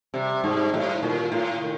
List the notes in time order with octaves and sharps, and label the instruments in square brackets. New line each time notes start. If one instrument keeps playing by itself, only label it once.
[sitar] C3 [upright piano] G3
[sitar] G#2 [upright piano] G3
[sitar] A2 [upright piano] G3
[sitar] A#2 [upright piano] D#3
[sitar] A2 [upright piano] F4
[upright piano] D#3